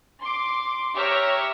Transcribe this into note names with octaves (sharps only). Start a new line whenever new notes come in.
C6 D6
G4 C#5 E5 A#5 F6